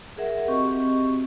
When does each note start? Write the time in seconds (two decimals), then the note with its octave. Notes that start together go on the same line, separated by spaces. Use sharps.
0.17 G#4 A#4 E5 F#5
0.48 C4 F#4 G4 D#5 C#6